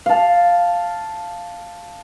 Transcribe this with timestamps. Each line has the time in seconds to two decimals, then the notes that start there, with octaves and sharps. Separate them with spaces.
0.06 F5 A5